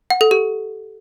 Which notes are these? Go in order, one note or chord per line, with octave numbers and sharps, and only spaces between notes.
F#5
A4
G4